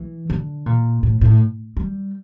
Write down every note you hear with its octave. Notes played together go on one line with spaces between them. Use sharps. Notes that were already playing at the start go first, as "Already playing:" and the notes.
Already playing: E3
D3
A#2
A2
A2
G3